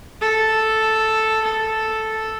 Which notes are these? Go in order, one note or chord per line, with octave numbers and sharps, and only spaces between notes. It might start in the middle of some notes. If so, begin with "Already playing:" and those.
A4
A4